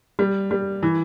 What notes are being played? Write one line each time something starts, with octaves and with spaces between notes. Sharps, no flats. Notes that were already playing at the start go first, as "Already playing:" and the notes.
G3
G3
E3